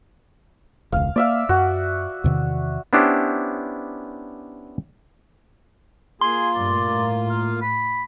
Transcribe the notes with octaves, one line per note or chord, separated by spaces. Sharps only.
E1 C#2 F5
A#3 D5 E5 F5
F#2 F#4
E2 C3 D#3
B3 C#4 D4 E4 G4 C5
A#3 F4 G#4 C6
G2 A#2 A3 D5
A2
F5
B5